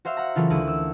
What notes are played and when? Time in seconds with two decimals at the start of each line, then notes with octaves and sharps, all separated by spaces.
0.05 F#4 C5 E5 F5
0.17 F#5 A#5
0.35 C#3 E3 F#3 F4 A4 A#4
0.50 D2 E4 D#7
0.68 E6